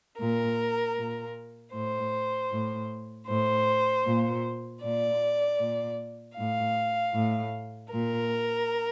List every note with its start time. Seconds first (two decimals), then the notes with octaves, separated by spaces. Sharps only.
0.19 A#2 A#4
0.97 A#2
1.73 A2 C5
2.51 A2
3.28 A2 C5
4.06 A#2
4.83 A#2 D5
5.60 A#2
6.37 A2 F5
7.14 A2
7.92 A#2 A#4